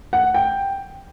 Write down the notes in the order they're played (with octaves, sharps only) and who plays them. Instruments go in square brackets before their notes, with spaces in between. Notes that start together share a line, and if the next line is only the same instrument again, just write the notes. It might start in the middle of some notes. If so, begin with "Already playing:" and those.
[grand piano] F#5
G5